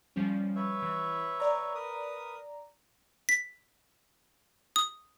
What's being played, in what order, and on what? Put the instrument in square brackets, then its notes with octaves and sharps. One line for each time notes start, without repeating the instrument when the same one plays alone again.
[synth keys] F3 G3 C#4
[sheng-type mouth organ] B4 C#5 E5
[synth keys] E3
D5 A#5
[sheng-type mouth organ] A#4 B4 D#6
[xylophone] B6
D#6